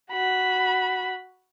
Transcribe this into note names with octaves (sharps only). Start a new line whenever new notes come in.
F#4 B5